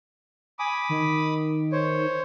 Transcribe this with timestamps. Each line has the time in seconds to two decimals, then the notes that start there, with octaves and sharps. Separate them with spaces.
0.59 G#5 B5 D6 D#6
0.89 D#3
1.72 C5 C#5